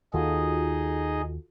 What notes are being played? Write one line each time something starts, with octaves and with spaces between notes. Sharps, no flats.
D#2 D#3 D#4 F4 F#4 G#4 A4 D#5